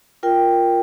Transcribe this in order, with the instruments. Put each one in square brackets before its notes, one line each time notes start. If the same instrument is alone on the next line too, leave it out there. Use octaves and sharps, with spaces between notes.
[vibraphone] F4 A#4 G5